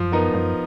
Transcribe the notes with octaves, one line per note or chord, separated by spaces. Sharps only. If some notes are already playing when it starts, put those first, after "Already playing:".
Already playing: F#2 F3
B3 D#4 A#4
F#2 F3